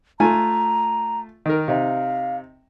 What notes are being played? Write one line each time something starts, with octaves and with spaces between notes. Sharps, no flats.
A3 F4 G#5 A#5
D#3 A#4
C3 D#4 F5